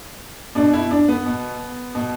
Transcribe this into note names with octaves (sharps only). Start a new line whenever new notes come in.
B2 D4
E4
D4
B3
B2
B2